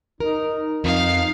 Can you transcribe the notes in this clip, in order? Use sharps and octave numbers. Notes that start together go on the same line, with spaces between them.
D#4 A#4
F2 D#4 F5